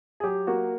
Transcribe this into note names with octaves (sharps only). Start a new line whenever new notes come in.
G#4
F#3 G4
A#3 F#4